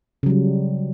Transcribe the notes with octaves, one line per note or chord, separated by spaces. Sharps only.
C#3 F#3 G3